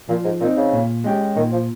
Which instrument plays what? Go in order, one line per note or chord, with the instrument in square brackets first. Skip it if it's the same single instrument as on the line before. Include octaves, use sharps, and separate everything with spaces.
[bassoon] A#2 [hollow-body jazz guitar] F3
[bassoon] G#2
[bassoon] A#2 [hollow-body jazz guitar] C4 D#4
[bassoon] C#3
[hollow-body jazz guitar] A#2
G#3 C#4 G4
[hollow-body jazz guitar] A#2 [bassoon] D#3
[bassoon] F3